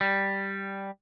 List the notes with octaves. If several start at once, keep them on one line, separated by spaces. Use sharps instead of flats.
G3